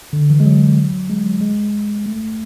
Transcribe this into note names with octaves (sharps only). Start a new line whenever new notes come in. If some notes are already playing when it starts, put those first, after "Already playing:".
D3
E3
G#3
F#3
G#3
F#3
G#3
A3